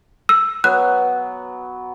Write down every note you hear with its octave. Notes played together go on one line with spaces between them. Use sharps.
E6
F#3 B3 F#6